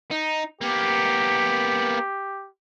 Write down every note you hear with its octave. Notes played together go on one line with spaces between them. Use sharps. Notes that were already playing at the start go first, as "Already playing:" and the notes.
D#4
A#3 B3 G4